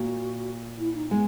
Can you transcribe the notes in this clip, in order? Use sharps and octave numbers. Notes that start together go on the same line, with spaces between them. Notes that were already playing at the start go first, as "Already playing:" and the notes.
Already playing: A#2 A#3 F#4
E4
D#4
G#3 B3